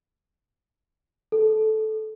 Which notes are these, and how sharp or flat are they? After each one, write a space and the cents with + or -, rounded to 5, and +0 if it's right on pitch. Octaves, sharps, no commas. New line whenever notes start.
A4 -15